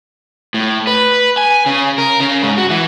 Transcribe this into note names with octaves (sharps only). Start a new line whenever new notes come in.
A2
B4
G#5
C#3
A#4
C#3
G#2
F#4
E3